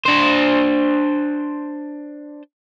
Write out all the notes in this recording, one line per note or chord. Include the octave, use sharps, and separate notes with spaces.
D4 C5